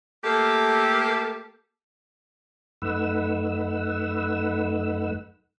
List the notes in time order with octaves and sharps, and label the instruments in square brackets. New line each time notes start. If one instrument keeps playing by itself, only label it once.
[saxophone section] A3 A#3 G4 A4
[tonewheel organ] F#2 A3 D#4 B4 F#5 E6